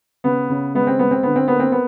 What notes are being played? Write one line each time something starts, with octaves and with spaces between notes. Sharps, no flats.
C#3 B3
C#3
G#3 B3
C4
G#3 B3
C4
D3 B3
C4
A#3 B3
C4
B3